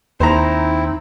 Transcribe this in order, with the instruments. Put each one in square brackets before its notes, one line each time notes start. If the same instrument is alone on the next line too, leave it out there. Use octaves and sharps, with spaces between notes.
[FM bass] D#2 [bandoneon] C4 E4 [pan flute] D#4 [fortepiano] C5 A#5